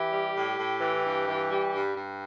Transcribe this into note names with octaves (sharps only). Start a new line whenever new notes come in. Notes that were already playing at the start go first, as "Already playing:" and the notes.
Already playing: E3 G4
G3
A2
A2
E3
G2
E3
G3
G2
G2